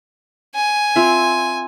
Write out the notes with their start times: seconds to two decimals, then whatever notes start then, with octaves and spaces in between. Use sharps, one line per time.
0.55 G#5
0.96 C4 F4 E5